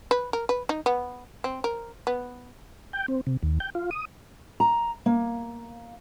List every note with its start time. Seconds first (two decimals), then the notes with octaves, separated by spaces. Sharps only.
0.11 B4
0.33 A#4
0.49 B4
0.69 D#4
0.86 B3
1.44 C4
1.64 A#4
2.07 B3
2.93 G5
3.08 C4
3.27 C3
3.43 D#2
3.60 G5
3.75 F4
3.91 D#6
4.60 A#5
5.06 A#3